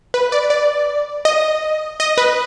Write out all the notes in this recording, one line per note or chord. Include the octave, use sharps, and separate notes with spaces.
B4
D5
D5
D#5
D#5
B4